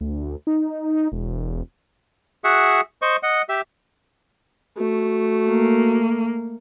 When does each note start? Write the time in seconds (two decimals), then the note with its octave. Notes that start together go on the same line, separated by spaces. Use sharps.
0.01 D2
0.47 D#4
1.12 E1
2.44 F#4 G#4 E5 F#5
3.02 C5 D#5 C#6
3.23 D#5 F#5
3.49 G4 E5
4.78 A3 F#4
5.48 A#3